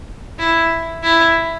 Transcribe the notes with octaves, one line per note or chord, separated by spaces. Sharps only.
E4
E4